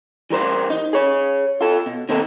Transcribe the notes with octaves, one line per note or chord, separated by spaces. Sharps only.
E3 G3 A#4 C5
D#4
G#4 C#5
F4 A4
B2
D#3 A#3 C4 D#4 A4